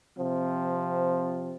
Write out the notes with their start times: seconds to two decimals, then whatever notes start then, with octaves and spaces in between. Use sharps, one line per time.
0.17 C3 F3 C4